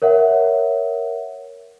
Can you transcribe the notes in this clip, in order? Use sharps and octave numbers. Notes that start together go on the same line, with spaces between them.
A#4 C#5 E5 F#5